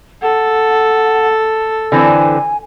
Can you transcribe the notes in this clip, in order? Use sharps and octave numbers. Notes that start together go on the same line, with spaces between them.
A4 F#5
D3 E3 C4 G#5